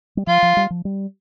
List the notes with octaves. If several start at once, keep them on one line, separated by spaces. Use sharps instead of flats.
G3
F3 F4
F3
G3
F3
G3